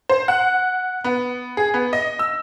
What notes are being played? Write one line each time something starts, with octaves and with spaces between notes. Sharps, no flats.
C5
F#5
B3
G#4
B3
D#5
E6